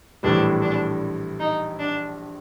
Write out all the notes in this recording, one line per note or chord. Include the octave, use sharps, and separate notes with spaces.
A#1 A2 E3 G3 D4
D4
D#4
D4